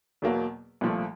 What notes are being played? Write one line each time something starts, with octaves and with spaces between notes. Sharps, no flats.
E2 B2 F#3 A#3
C2 A#2 F3 A3